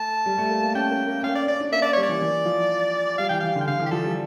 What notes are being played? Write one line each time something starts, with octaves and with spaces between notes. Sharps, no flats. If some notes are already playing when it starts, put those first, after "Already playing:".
Already playing: A3 A5
G3
A3
A#3
A#3
C#4 G5
A#3
A#3
C#4 F5
D5
C#4 D5
D4
A#3 E5
D5
G3 C#5
D5
E3
E3
F3
G3 F5
E3 G5
E3 F5
D3
G5
D3 F5
E3
G4
F3 A4
G3